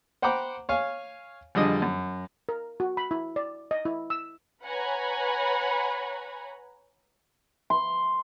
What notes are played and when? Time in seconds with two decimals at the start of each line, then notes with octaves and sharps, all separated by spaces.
0.22 C5 F#5 G5 A#5 B5 D6
0.69 C#5 F5 G#5
1.55 F2 D3 G3 G#4 D#5
1.82 F#2
2.49 A#4
2.80 F#4
2.97 B5
3.11 E4
3.36 D5
3.71 D#5
3.85 E4
4.10 E6
4.64 B4 C#5 F#5 G#5 A#5 B5
7.70 C6